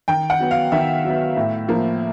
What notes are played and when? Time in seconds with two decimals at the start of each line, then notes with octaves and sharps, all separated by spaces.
0.08 D#3 G5
0.30 F#5
0.40 F#3 B3
0.51 F5
0.72 D#3 E5
1.04 F#3 B3
1.36 A2
1.68 F3 A#3